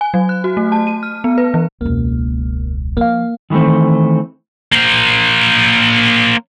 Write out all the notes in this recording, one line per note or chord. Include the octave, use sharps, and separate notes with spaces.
G#5
F#3
F#6
F#4
A3
A5
D#7
F6
B3
B4
E3
E1 C#2 A#3
F3 A#3 F5
D#3 E3 G3 A3 C4
A#3 C5